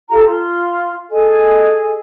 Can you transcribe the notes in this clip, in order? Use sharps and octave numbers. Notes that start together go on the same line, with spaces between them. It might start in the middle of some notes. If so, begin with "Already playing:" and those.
F4 G4 A4 A#5
F4 C6
G#4 A4 D#5 G#5